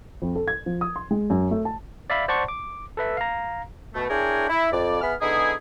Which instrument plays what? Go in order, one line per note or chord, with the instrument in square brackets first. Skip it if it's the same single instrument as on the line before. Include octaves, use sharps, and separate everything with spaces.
[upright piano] F2
A4
G#6
F3
D#6
C6
G#3
F#2
A3
A5
[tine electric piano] D5 E5 F5 B5
C5 D5 F#5 A5 C6 C#6
D6
A4 B4 E5
F5 A#5
[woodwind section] B2 A3
D4 E4 G#4 A#4 C#5 G5
E4
F2 D5
B3 G#4 E5 B5 F6
D3 B3 D#4 E4 G#4